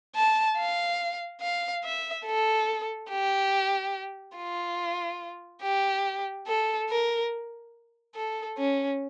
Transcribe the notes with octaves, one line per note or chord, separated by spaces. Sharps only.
A5
F5
F5
E5
A4
G4
F4
G4
A4
A#4
A4
C#4